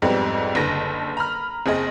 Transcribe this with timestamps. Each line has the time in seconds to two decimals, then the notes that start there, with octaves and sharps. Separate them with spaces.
0.02 F2 G#2 G3 B3 C4
0.55 F#1 D3 B4 A5 A#6
1.17 A#5 B5 F6
1.66 F#1 C4 G#4 D#5